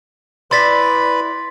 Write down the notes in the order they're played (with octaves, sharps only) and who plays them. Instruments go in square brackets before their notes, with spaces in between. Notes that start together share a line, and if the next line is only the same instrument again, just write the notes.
[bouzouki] E4 D5 [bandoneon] B4 B5 [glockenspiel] C6 A6 B6